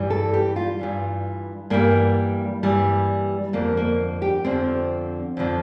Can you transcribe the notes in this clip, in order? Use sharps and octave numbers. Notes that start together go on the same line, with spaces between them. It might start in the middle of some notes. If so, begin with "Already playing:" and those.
Already playing: G2 E3 G3
A4
G4
F4
G2 E3 G3
G2 E3 G3 A#3
G2 E3 G3
F2 D3 F3 A#3
A#3
G4
F2 D3 F3 C4
F2 D3 F3